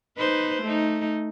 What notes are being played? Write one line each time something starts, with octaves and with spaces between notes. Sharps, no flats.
D#4 B4 C5
A3 D#4